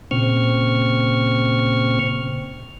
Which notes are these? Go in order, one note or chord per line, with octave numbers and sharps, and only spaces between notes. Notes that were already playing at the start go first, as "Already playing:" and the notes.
A#2 C#3 C4 C#6 F6